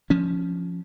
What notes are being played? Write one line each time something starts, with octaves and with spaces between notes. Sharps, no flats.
F3 C#4